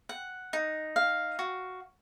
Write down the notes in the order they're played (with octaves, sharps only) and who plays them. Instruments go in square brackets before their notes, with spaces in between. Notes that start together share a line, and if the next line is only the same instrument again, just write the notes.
[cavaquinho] F#5
D#4
F5
F#4